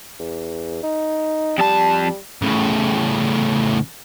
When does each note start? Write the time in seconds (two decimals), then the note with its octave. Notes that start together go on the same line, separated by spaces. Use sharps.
0.20 E2
0.83 D#4
1.58 F2 G3 A5
2.42 A2 C#3